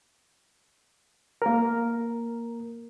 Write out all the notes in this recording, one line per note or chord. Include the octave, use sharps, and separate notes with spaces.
A#3 A#4